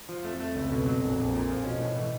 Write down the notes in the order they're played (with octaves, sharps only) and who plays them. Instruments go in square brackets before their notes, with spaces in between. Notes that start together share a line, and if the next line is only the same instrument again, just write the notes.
[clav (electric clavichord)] F3
[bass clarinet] F2
[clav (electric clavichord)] A3
A3
C#2
B2
F#3
A#1
A#1
A#2
F3
[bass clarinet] B2 [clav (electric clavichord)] C#4
[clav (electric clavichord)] A2
E3